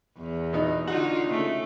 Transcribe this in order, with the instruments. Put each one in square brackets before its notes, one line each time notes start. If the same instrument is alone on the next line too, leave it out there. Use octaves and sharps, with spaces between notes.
[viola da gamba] E2
[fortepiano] B2 D#4
[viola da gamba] D3 D#4 F4 [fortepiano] F#4
[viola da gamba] C#3 A3